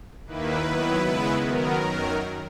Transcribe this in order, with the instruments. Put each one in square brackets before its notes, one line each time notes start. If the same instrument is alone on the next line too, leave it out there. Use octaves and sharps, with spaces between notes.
[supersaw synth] D#2 D#3 A#3 E4 B4
D#3 F#3 B3 E4
C#3 G#3 B3 E4
D#3 F#3 B3 A#4
F#2 D#3 F#3